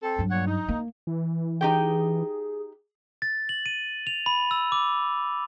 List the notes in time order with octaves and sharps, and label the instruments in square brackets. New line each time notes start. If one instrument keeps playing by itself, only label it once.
[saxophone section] C4 A4
[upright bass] G2 F#3
[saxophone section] A#2 C#5 F#5
D#4
[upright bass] A#3
[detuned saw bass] E3
[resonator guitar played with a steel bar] D#4 G4 G5 [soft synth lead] G#4
[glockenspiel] A6
F#7
D#7
F7
B5
E6
D6